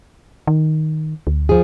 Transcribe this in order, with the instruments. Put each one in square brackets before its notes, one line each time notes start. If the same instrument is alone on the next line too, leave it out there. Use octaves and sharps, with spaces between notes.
[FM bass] D#3
D2
[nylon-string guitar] F3 G#4